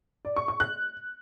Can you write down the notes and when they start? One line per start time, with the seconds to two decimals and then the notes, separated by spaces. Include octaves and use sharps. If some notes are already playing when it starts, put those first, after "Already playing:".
0.25 D5
0.36 C#6
0.48 C#6
0.60 F#6